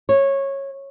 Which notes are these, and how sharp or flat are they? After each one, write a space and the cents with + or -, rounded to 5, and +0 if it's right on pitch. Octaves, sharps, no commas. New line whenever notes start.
C#5 -15